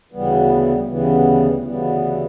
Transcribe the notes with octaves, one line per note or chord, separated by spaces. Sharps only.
D2 C#3 E3 G3 B3
D2 C#3 E3 G3 B3
D2 C#3 E3 G3 B3